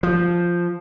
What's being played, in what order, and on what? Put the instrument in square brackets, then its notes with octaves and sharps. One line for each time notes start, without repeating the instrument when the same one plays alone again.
[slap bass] F3